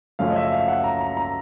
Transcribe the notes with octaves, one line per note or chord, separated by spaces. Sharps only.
F#2 C#3 F3 A3 C#4 F5
D#5
E5
F5
F#5
A#5
A#5
A#5